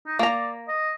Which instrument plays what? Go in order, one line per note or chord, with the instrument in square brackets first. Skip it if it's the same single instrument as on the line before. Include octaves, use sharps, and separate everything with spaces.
[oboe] D#4
[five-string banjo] A#3 A#5 [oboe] D5
[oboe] D#5